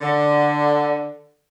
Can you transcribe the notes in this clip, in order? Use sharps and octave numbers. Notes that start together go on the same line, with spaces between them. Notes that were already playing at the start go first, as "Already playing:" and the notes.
D3